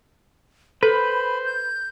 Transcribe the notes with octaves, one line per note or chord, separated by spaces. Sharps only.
A4 B4 C5 B5
G6